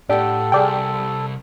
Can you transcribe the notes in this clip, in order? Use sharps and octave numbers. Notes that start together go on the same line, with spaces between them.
A2 D4 G4 A4 F#5
C2 G#4 D5 G5